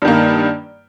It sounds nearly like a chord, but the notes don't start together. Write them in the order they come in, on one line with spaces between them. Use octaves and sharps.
G2 D#3 A#3